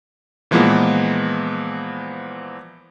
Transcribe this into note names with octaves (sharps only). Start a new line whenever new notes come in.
A#2 E3 F3 G#3 A#3 B3